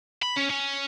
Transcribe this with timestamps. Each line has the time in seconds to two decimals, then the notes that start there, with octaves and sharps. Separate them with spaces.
0.23 B5
0.37 C#4
0.50 C#4